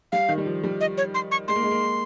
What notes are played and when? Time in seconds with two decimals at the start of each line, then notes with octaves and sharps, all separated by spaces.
0.12 G3 F5
0.29 D#3
0.38 G3
0.46 F3
0.64 G3
0.81 D#5
0.97 C#5
1.14 C6
1.31 C#6
1.48 G#3 C6
1.56 A#3
1.63 G#3
1.71 A#3